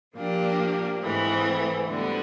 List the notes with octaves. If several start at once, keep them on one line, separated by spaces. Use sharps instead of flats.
A#2 F3 A#3 D4 G4
G#2 E3 A3 C4
D2 D3 G3 B3